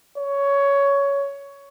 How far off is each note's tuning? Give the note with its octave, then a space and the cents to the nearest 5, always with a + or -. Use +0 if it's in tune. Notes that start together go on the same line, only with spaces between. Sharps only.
C#5 +15